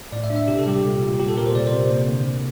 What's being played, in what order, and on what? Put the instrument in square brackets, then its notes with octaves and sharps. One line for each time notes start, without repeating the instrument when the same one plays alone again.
[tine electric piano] A2 D5
E5
D4
E5
C3 G4
A4
G3 G4
A#2
A#2
A#2 G4
A4
A#2 A#4
C5
C3 D5
C5
C3
A#3
D3